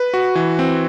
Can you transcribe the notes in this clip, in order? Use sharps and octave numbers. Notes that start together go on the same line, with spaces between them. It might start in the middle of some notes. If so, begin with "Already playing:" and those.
Already playing: B4
F#4
E3
C4